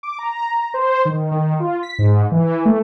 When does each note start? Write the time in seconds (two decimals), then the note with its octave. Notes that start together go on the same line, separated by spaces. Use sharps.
0.03 D6
0.19 A#5
0.74 C5
1.05 D#3
1.31 D#3
1.60 F4
1.83 B6
1.99 G#2
2.32 E3
2.65 A3